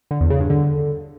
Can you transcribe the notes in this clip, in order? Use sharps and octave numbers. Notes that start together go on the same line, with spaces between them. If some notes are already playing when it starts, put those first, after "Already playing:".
D3
E2
C#3
G2
D3